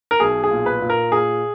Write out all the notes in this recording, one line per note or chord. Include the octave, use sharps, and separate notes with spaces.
A#4
B1 G#4
G#4
A#2
B4
A#2
A#4
A#2 G#4